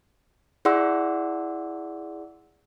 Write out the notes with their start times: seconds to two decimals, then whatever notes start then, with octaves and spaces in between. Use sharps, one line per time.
0.65 E4 G#4 D5 F#5 C6 E6